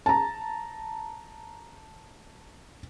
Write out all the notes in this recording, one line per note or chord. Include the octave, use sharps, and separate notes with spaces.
A5 A#5